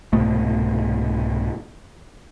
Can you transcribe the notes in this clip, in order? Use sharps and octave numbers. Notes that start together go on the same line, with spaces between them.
C2 G#2 B2 A3